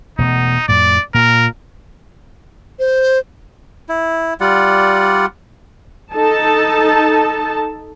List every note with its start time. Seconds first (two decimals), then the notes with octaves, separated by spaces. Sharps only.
0.18 E1 B2 A3 D#4
0.68 F2 A2 D5
1.14 A#2 A#4
2.79 C5
3.89 E4
4.41 G3 F4 D5 F#5
6.15 D#4 A4 A5